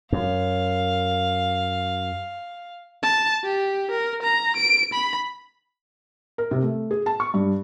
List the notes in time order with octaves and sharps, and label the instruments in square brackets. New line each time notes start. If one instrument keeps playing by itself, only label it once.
[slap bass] F#2 [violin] F5
[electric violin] A5
G4
A#4
A#5
D7
B5
[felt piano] A#4
C3
A3
G#4
A5
C#6
G2